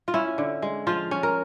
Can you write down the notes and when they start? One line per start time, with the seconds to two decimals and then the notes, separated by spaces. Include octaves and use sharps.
0.08 F4
0.14 C#4 E4
0.38 D3
0.62 G#3
0.87 F3 F4
1.11 C#4
1.23 A#4